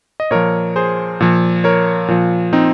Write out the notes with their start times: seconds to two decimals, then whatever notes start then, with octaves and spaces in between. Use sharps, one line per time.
0.20 D#5
0.31 A#2 F3 A#4 C#5
0.76 G#4 C5
1.20 A#2 F3
1.64 A#4 C#5
2.08 A#2 F3
2.53 C4 D#4